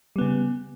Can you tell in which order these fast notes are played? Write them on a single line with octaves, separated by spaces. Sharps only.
G3 B3 C#3